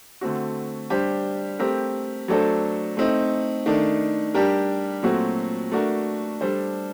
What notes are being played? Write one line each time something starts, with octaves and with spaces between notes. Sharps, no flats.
D3 A3 C4 F#4
G3 D4 G4 C5
A3 C4 G4 A#4
F#3 A3 D4 A4 C5
A3 C4 D#4
D#3 A3 D4
G3 D4 G4 A#4
A#2 F#3 A3 C4 F#4
A3 D4 F#4 A#4
G3 D4 A4 C5